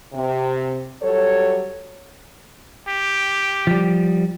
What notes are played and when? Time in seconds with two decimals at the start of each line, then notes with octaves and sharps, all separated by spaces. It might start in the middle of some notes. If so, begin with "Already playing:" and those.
0.14 C3
1.02 F#3 G3 A4 C#5
2.88 G4
3.67 F3 G3